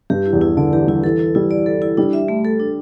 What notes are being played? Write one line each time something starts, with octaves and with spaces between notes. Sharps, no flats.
G2 G4
E4
E2
E4
D3 D5
E3 G4
G3 E4
E3 A4
E4
G3 E4
D5
A4
E4
G3 D4
E5
A3
A4
D4